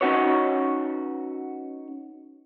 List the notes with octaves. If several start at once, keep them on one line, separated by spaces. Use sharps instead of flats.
C#4 D#4 F#4 B4 C#5